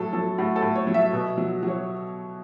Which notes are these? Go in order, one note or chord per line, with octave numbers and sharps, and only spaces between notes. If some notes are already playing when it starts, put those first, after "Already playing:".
Already playing: A2 F#3 A4
F#3 A4
A2 F#4
A4
A2
C#5
F#3
E5
B2
F#3
F#3
C#5